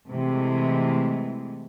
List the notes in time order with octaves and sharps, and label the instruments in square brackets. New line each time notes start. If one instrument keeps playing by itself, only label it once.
[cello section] C3 E3 G#3 A3